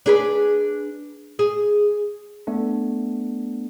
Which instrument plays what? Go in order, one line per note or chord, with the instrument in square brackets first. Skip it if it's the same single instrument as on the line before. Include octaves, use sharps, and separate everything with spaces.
[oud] D4 G#4 B4
G#4
[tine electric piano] A3 B3 D4